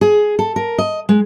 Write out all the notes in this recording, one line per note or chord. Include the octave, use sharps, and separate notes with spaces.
G#4
A4
A#4
D#5
G#3